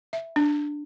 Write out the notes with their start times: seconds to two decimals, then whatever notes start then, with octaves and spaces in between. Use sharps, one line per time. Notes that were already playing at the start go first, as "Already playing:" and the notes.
0.13 E5
0.36 D4